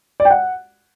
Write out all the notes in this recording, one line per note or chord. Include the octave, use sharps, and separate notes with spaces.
D5
G5
F#5